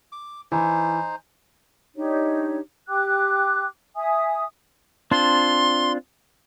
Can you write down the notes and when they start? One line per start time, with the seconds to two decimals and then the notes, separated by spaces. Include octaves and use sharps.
0.12 D6
0.52 E3 D#4 C5
1.96 D4 D#4 G4 C#5
2.88 G4 G5 D6 F#6
3.96 E5 G#5 D#6
5.11 C4 D4 F4 C6